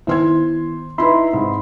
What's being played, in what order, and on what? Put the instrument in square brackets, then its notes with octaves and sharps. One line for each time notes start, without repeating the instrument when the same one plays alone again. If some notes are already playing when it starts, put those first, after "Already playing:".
[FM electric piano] D#3 B3 E4 [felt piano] C5 C6 G#6
[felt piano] D#4 E4 B4 [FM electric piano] E5 B5 C6
[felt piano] G#2 C3